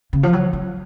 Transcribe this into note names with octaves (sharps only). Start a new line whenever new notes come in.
C#3
F3
F#3
F#3